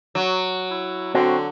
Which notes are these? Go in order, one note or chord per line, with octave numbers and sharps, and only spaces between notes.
F#3
E4
D3 C4 F#4